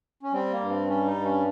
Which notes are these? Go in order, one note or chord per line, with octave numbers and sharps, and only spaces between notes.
C#4
G3 C4
A#3
G2
C4
G3 C#4
D#4
G2
C#4